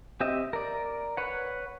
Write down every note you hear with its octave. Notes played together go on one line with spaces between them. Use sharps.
C4 G4 D#5 E5
A#4 D5
B4 C#5 F#5